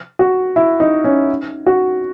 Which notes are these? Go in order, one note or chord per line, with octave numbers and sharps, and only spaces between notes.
F#4
E4
D#4
C#4
F#4